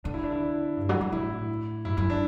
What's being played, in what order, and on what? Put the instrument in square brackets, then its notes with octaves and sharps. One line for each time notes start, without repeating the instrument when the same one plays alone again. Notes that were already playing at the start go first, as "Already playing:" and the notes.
[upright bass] D3 [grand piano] D4
[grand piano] E4
D4
E4
[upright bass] G2
F#3
E3
[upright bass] A2 [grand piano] E4
[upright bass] F#2 [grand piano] E4
[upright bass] F#2 [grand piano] E4
[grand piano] D4